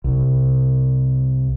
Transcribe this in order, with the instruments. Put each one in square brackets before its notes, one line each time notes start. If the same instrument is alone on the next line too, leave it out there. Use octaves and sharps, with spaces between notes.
[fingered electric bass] C2